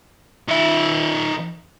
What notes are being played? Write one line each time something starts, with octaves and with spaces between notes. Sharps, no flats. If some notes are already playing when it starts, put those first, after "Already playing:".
D#3 E5